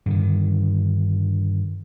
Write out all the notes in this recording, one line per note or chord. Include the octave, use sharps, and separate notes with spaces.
G2 D3 D#3